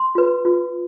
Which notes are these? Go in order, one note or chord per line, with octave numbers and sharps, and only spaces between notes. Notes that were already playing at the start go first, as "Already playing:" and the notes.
Already playing: C6
F4 B4
F4 B4